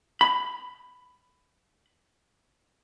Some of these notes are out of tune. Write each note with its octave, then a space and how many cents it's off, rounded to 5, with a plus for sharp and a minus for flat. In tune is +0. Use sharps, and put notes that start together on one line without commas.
B5 +15